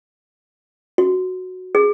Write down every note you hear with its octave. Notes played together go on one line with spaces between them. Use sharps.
F#4
G#4